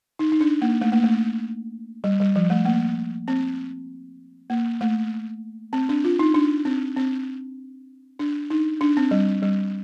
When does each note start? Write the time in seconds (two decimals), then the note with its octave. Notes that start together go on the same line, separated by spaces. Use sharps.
0.19 D#4
0.32 D#4
0.41 D4
0.62 A#3
0.81 A3
0.92 A#3
1.04 A3
2.04 G3
2.20 G3
2.36 F3
2.50 A3
2.65 A#3
3.28 C4
4.50 A#3
4.81 A3
5.73 C4
5.89 D4
6.04 F4
6.19 D#4
6.34 D4
6.65 C4
6.96 C4
8.19 D4
8.50 D#4
8.81 D4
8.97 C4
9.11 G3
9.43 G3